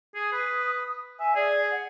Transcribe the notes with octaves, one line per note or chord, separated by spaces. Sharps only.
G#4 D#6
B4
E5 G#5
G#4 D5
F#5